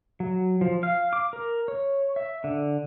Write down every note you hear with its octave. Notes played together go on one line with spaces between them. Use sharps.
F#3
F3
F5
D6
A#4
C#5
E5
D3